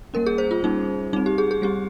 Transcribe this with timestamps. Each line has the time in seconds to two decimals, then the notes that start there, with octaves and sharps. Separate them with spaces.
0.14 G3 A#3 C#4 A#4
0.26 G#4
0.38 C5
0.51 F4
0.63 G3 A#3 C#4 D#4
1.13 G3 C4 D#4
1.26 G4
1.38 G#4
1.51 G#4
1.62 G3 C4 G4